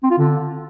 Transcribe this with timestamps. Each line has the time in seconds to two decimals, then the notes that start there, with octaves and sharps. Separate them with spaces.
0.03 C4
0.11 F4
0.18 D3